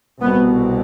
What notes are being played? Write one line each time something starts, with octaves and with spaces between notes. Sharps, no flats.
C2 B2 B3